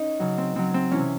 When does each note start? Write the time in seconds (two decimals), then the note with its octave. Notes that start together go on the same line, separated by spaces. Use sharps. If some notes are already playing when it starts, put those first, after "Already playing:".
Already playing: C#4 D#4
0.20 C#3 F#3
0.38 C4
0.56 C#3 F#3 C4
0.74 C4
0.91 C3 E3 C#4